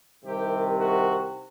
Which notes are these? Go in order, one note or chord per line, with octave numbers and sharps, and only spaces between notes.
C2 C3 D#3 G4
F#4